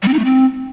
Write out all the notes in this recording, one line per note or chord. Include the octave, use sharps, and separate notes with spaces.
G3
C4
D#4
A3
C4